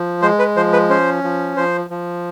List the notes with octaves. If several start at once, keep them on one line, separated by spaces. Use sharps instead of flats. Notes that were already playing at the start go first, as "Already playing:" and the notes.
Already playing: F3
G#3 C5
B4
F3 C5
B4
C#4 C5
F3
F3 C5
F3